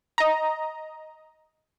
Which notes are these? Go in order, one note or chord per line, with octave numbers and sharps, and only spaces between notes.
D#5 A#5